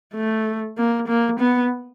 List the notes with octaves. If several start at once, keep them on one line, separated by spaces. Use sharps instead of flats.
A3
A#3
A#3
B3